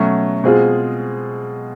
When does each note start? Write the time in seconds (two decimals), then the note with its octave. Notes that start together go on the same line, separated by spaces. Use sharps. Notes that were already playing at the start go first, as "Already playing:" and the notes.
Already playing: B2 F#3 A3 C#4
0.44 B2 G#3 C4 F4 G#4